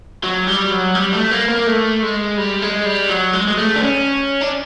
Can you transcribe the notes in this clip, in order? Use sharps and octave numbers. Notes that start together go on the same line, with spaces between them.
F#3
G3
F#3
G3
A3
A#3
A#3
A3
G#3
G3
G#3
G3
F#3
G#3
G#3
A3
D4
C#4
D4